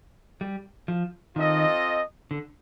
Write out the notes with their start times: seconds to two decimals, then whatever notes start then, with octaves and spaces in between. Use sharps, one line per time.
0.41 G3
0.88 F3
1.35 D#3 C4 F4 A4 D#5
2.31 D3